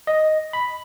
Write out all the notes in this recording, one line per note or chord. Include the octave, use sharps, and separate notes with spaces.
D#5
B5